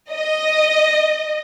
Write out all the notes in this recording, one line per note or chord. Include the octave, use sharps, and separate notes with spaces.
D#5